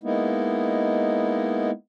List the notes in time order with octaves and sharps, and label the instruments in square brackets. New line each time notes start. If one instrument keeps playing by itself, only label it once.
[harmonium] G#3 A#3 B3 D#4 E4